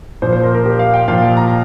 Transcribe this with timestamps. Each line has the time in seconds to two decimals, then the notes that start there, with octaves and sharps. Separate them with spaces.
0.22 A#2 F3 C5
0.33 C5
0.43 A#4
0.55 A#4
0.65 G4
0.79 F5
0.94 G5
1.08 A#2 F3 F5
1.22 G5
1.37 A#5